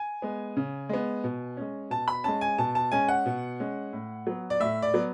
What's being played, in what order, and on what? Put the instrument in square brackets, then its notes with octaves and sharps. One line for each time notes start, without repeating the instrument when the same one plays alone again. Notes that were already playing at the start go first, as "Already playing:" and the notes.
Already playing: [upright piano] G#5
G#3 B3
C#3
G#3 B3
B2
G#3 C#4
B2 A5
B5
G#3 C#4 A5
G#5
B2 A5
A5
G#3 C#4 G#5
F#5
B2
G#3 C#4
A2
F#3 B3
D5
A2 E5
D5
F#3 B3